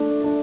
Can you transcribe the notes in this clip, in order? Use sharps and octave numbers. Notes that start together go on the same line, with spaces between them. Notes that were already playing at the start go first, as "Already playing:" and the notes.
Already playing: A3 D4
D4